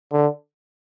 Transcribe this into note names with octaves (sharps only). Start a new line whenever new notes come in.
D3